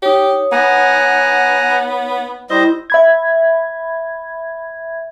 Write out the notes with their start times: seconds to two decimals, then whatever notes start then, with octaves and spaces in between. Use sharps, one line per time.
0.02 D#4 G4 C#5
0.52 B3 F#5 G#5 A#5
2.50 G3 E4 C5 D#5
2.90 E5 B5 G#6